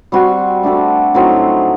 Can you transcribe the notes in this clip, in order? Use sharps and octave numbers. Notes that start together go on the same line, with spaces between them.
G3 C4 F#4
A3 D4 F#4 A4
A2 F#3 C4 D#4